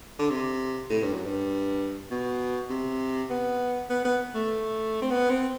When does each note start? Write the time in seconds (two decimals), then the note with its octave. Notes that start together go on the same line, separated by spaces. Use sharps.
0.19 D3
0.30 C3
0.90 A2
1.02 G2
1.13 F#2
1.26 G2
2.11 B2
2.70 C3
3.30 B3
3.90 B3
4.05 B3
4.35 A3
5.02 C4
5.10 B3
5.30 C4